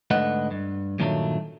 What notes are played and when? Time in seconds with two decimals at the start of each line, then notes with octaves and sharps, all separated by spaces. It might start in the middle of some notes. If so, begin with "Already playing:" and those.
0.11 G#2 D3 A3 B4 D#5 F#5
0.51 G2
0.99 G2 A#2 D#3 F#3 G3 A3